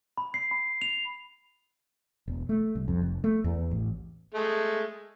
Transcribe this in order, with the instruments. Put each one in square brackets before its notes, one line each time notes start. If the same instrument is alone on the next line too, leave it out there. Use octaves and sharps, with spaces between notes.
[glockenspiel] B5
C7
B5
F7
[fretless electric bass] E1
A3
C2
F2
F1
A3
E2
A1
[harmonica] G#3 A3